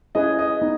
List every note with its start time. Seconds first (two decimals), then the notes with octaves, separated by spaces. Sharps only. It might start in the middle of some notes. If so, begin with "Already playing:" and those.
0.15 C#4 E4 G#4 B4 D#5
0.39 D#5
0.62 B3 D#4